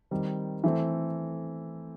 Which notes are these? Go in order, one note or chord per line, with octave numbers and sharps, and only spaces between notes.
D#3 G3 C4
E3 A3 C4